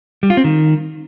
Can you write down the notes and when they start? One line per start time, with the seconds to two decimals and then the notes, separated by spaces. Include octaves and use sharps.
0.23 G3
0.30 F4
0.37 C4
0.44 D#3